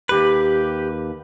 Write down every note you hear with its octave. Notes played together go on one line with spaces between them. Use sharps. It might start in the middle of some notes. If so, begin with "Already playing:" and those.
D#2 G#2 G4 B4